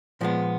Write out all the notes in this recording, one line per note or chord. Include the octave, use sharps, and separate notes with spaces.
A#2 F3 G#3 B3